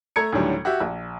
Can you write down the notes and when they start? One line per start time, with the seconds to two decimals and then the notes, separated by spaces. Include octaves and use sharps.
0.16 A3 A#5 G#6 C#7
0.32 D2 A2 D3 D#3 F#3 G3
0.65 F#4 G4 E5
0.80 A#1